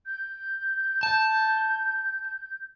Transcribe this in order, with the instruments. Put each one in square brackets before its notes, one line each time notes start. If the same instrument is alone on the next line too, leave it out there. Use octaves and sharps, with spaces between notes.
[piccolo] G6
[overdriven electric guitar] A5